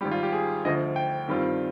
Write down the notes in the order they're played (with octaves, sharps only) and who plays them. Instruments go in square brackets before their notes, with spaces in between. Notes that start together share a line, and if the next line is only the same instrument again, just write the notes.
[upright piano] G#1 G#2 G3 [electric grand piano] G4
[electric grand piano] F4
G4
G#4
[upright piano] D2 D3 F3 [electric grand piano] D#5
[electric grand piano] G5
[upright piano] G2 D#3 G3 C4 F4